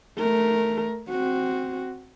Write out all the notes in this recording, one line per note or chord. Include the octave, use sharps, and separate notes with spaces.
A3 A#4
C4 F#4